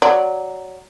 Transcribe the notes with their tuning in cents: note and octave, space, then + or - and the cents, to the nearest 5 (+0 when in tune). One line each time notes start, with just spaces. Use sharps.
F#3 +5 D5 +0